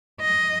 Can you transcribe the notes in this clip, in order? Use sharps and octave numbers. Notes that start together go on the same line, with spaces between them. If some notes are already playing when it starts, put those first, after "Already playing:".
D#5